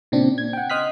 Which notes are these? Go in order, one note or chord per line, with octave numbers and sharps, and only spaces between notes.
A#2 C#3 C4 D4
G#6
F#5 G5
D#5 C6 D#6 F6 F#6 B6